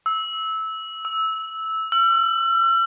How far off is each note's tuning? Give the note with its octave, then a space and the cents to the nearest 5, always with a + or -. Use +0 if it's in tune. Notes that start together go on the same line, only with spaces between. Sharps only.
E6 -15
E6 -10
E6 +45